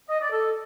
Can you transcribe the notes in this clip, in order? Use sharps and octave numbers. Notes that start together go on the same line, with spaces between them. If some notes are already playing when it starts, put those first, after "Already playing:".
D#5
D5
A4